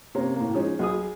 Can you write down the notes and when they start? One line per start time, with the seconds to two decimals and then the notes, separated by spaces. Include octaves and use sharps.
0.15 C3 A#3 C#4
0.36 A2 A#3
0.54 F3 G#3 C#4 D#4
0.79 B1 G#4 D#6